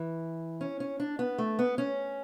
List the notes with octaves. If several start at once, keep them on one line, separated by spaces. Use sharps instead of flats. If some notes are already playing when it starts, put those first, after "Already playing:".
Already playing: E3
C#4
C#4
D4
B3
A3
B3
C#4